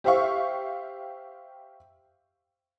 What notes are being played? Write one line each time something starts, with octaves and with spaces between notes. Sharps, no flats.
G4 C5 E5 F5 C#6